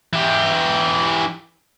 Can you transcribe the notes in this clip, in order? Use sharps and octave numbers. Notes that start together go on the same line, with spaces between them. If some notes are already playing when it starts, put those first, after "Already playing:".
E3 G4